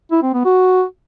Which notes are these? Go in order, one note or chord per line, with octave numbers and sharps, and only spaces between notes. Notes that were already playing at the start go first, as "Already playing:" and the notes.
E4
C4
B3
F#4